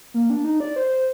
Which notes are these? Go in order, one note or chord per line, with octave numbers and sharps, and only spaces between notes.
A#3
D4
D#4
D5
C5